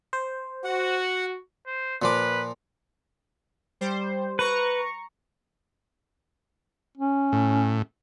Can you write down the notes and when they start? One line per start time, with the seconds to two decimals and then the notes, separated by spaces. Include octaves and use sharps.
0.13 C5
0.64 F#4 F#5
1.67 C5
2.02 A#2 F3 B4 D6
3.81 G3 C5
4.39 B4 A#5 C#6
6.97 C#4
7.32 A2